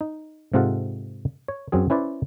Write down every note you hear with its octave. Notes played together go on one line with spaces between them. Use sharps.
D#4
G#2 C3 F4 A4 F#5
C#5
F#2 F#3 C4 G#4
C#4 E4 B4 C5 D5